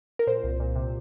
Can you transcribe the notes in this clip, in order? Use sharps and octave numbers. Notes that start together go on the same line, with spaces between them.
A#4
A#2 C5
C2
A#2
C3